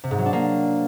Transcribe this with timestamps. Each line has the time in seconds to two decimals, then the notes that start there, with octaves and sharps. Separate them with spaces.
0.04 C3
0.11 G#2
0.18 F#3
0.26 D4
0.33 A#3